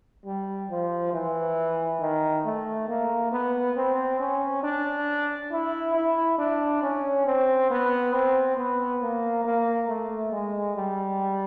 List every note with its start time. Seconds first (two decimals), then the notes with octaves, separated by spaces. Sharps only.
0.26 G3
0.70 F3
1.13 E3
2.00 D#3
2.45 A3
2.88 A#3
3.32 B3
3.76 C4
4.20 C#4
4.63 D4
5.51 E4
5.95 E4
6.38 D4
6.82 C#4
7.26 C4
7.70 B3
8.13 C4
8.57 B3
9.02 A#3
9.45 A#3
9.88 A3
10.32 G#3
10.76 G3